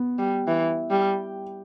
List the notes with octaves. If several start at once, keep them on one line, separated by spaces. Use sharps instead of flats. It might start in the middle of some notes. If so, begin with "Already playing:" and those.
Already playing: B3
G3
E3
G3